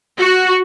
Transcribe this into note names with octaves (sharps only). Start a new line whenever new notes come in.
F#4